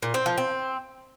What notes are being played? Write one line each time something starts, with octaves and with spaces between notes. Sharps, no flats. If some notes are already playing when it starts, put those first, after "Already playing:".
A#2
C4
F3
C4